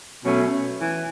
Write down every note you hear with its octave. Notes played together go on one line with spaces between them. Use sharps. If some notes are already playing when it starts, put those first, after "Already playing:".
B2 F#3 A3 C#4
E3